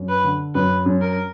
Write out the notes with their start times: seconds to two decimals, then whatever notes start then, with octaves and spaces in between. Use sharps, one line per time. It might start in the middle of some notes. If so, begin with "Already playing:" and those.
Already playing: F#2
0.09 B4
0.24 D3
0.55 F#2 B4
0.86 F#2
1.02 A#4